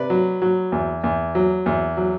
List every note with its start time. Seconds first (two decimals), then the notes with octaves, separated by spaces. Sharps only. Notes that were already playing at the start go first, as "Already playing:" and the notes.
Already playing: C3 B4 D5
0.10 F#3
0.42 F#3
0.72 E2
1.04 E2
1.35 F#3
1.66 E2
1.97 F#3